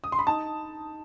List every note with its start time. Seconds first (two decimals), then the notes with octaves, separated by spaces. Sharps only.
0.04 D#6
0.12 C6
0.19 B5
0.27 D#4 A5